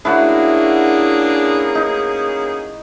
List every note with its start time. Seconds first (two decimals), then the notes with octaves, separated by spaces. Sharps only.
0.05 A#3 C#4 D4 E4 F#4 G#4
1.75 D#4